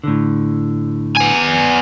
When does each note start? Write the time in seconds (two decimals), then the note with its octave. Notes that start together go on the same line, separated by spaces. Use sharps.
0.04 A2 D3
1.17 B3 G#5